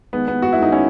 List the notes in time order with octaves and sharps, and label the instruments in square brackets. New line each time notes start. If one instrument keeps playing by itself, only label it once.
[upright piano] D#3 G#3 B3
B3
F#4
E4
D#3 G#3 D#4
C#4 E4